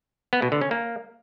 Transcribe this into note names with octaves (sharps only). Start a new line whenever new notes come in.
B3
B2
D3
C#4
A#3